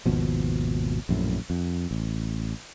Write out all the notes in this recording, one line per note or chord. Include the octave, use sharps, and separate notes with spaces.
G#1 D#2 B2 F3
A#1 F#2 A2
F2
A1